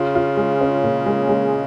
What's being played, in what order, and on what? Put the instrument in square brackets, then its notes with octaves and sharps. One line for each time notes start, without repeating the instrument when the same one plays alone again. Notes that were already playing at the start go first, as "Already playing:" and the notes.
Already playing: [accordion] C#3 [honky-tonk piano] F4
[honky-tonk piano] F4
G#3
C#4
A#2
G#3
G#3